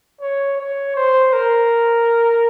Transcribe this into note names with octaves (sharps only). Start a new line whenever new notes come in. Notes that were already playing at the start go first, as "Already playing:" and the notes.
C#5
C#5
C5
A#4